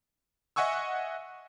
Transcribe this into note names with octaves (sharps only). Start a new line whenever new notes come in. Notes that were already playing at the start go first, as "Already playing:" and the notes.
D#5 E5 F#5 G#5 C#6 E6